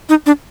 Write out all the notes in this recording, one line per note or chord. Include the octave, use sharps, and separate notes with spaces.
D#4
D4